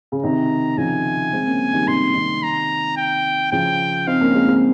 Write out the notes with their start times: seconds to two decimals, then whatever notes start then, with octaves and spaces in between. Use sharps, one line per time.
0.12 C#3
0.22 C3 D#3 A#5
0.77 C#3 F3 G#5
1.33 G#3 C4
1.46 A#3 C#4
1.73 D#3 G3
1.87 C3 D#3 C6
2.14 C3 D#3
2.43 A#5
2.97 G5
3.52 C#3 F3 G5
4.07 C4 D#4 F5
4.21 A#3 C#4
4.34 G#3 C4
4.47 G#3 C4